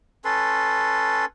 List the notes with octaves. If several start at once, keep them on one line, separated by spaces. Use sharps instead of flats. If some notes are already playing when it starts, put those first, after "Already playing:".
C#4 A4 B4 C6